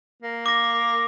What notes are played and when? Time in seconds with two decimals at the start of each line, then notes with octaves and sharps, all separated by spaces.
0.23 A#3
0.46 D6 A#6